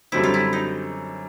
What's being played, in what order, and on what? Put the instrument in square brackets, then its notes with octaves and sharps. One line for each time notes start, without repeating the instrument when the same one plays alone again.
[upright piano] F#2 D3 G3 C4 [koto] E4
[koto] F4
E4
D#4